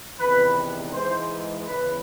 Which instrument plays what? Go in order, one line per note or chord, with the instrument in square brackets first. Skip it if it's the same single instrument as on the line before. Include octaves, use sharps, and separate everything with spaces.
[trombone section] E2 C3 D#3 B4
G#2 E3 G#3 C5
E2 C#3 E3 B4